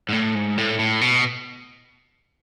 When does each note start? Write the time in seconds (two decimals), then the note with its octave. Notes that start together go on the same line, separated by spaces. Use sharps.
0.09 G#2
0.13 A2
0.35 G#2
0.58 A2
0.79 A2
1.01 B2